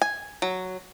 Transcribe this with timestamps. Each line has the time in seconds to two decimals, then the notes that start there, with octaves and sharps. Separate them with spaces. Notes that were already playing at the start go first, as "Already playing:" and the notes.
0.02 G#5
0.42 F#3